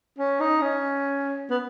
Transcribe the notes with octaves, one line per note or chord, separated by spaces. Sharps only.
C#4
D#4
C#4
B3